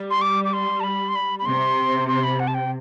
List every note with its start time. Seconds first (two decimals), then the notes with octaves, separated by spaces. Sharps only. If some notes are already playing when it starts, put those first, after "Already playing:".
Already playing: G3
0.10 C6
0.21 D6
0.45 D6
0.53 C6
0.80 A5
0.83 B5
1.08 C6
1.15 B5
1.39 B5
1.46 C3 C6
2.08 C6
2.23 B5
2.40 F#5
2.47 A5
2.54 G5